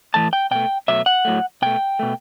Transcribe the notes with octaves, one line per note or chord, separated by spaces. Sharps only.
A2 E3 A3 A5
G5
B2 A3 G5
B2 F#3 A3 E5
F#5
A2 F#3 A3
B2 A3 G5
B2 A3